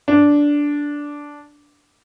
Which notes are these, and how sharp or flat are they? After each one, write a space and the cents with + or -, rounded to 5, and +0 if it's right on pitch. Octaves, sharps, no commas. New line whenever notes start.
D4 -10